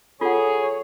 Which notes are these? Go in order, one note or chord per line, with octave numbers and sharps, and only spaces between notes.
F4 G#4 A4 C#5 F#5